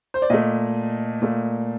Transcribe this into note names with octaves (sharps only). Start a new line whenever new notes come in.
C5
D5
A#2 A3 D#5
A#2 A3